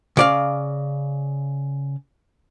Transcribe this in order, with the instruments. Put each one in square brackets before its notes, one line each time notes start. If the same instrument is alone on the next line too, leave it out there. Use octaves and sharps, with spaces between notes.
[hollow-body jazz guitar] C#3 D5 F5